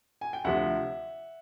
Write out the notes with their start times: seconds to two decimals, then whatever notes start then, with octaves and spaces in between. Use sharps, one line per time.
0.21 G#5
0.33 G5
0.44 D2 C3 F3 E5 F#5